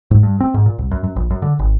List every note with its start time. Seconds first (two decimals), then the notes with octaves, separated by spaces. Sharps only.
0.11 G#2
0.23 G2
0.40 C4
0.54 G#2
0.66 A#2
0.78 C2
0.91 F#2
1.04 F#2
1.16 A#1
1.31 F#2
1.42 D3
1.59 G#1